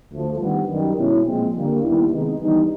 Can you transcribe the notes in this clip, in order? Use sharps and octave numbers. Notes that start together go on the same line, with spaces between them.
D2 D3 F3 A3
G2 D#3 G3 B3
F#2 D#3 G3
B2 G#3 C#4 E4
A#2 F3 G#3 C4
G2 D3 G3 A#3
D#2 D#3 G3 B3 E4
C3 D#3 G#3 B3 D#4
G2 E3 G3 B3 D#4